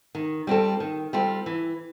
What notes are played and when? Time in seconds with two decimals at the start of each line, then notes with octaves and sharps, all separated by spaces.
0.15 D#3
0.47 G3 C4 F4 A4
0.80 D#3
1.13 G3 C4 F4 A4
1.46 E3